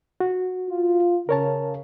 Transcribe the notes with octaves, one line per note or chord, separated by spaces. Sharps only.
F#4
F4
C#3 A#4 C#5 A5